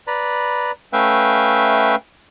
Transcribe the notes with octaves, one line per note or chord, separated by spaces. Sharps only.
B4 D5 A#5 B5
A3 C#4 B4 E5 F5 G5